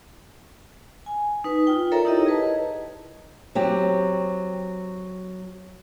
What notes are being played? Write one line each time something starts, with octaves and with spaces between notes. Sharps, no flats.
G#5
D#4 B4
F4 G5
A4 A#4 C#5 D5 E5 A#5
D#4 E4 G4 C#5 D#5
G#4 B4 A5
F#3 C4 G4